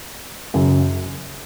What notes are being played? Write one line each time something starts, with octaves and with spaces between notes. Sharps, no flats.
F#2 C#3 F#3